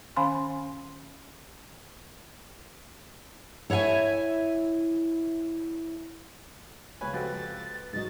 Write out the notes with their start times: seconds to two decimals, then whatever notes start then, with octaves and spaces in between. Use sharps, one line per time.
0.16 D#3 C#4 F5 G#5 B5 C6
3.70 E4 C#5 E5 F5 G#5
7.01 C#2 B4 C#5 G#5 B5
7.14 F2 F#4 G4 B4 A6
7.93 G#2 D#3 F#3 D#5 A6